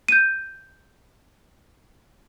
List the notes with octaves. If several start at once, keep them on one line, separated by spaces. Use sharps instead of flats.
G6 D#7